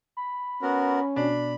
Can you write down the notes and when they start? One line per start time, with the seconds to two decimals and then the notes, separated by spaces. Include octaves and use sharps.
0.17 B5
0.62 B3 C#4 F#4 A#4
1.16 B2 D4 B5